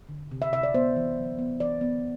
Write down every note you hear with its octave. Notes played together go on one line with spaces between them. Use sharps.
D3
C3
E5
C3 E5
D5
B3 C5
E3
F#3
B3
E3 D5
B3